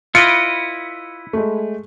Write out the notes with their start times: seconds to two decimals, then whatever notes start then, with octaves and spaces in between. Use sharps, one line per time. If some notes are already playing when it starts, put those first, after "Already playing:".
0.15 E4 F4 B4 D#5 C#7 D7
1.33 G#3 A3